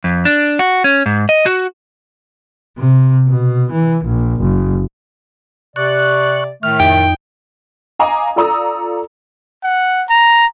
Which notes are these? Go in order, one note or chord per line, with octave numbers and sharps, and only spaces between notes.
F2
D4
F#4
C#4
G#2
D#5
F#4
C3
B2
E3
A#1
F#1
C3 D5 C#6 F#6
A2 D#3 A3 F6
F2 D#4 G5
D#5 F5 G#5 A#5 D6 D#6
F4 A4 D5 A#5 D#6 E6
F#5
A#5